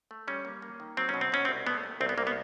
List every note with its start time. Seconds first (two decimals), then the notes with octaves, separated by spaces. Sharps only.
0.11 A3
0.28 G3 C#4
0.45 A#3
0.62 A#3
0.80 D#3
0.97 F#3 C4
1.09 B2 C#4
1.21 C4
1.32 B2 C#4
1.45 C4
1.49 C2
1.67 A3 B3
1.84 C3
2.01 C2 C4
2.09 B3
2.18 C2 A#3
2.27 B3